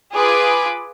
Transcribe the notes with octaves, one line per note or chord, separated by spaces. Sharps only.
F4 G#4 B4 D6